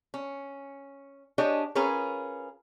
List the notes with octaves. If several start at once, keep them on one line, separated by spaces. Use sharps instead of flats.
C#4
D4 G4 G#4 C#5 D#5
C#4 F4 G#4 A#4 B4 C#5